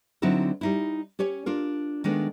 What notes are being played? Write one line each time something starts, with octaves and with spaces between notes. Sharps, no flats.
D3 F#3 C4 D#4 E4 A#4
G3 D#4 E4
C#4 G4 C#5 G#5
D4 F4 A#4
D#3 G#3 A3 B3 D4 D#4